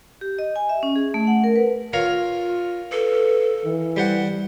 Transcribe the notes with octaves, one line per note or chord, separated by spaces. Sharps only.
G4
D#5
G#5
E5
C#4
G#4
A3
F#5
A#4
B4
F4 A#4 C#5 F5
A4 B4
E3
G3 C5 F#5